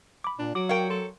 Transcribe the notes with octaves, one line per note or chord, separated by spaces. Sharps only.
B5 D6
A#2 D4
F#3 F#4 D6 D7
A#4 C#5 F5 G5
A4 C6